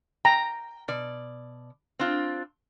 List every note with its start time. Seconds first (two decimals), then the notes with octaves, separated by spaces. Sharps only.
0.25 G5 A#5
0.88 B2 D5
1.99 C4 D4 F4